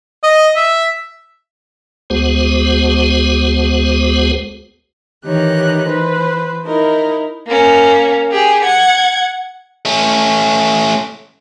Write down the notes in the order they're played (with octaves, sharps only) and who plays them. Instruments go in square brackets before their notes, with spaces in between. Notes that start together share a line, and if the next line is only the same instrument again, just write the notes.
[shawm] D#5
E5
[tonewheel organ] D2 G#3 B3 F#4 G#4 C5
[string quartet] D#3 E3 D#4 G4 C#5 F#6
E3 B4 C5
D#4 E4 A#4
[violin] A#3 C#4
G4 G#4
F#5 G#6
[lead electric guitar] A3 C#4